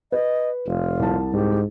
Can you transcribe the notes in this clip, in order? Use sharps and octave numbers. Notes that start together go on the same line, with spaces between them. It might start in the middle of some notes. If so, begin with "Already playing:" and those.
B4 D#5
F1 F4
C2 A5
G#2 G4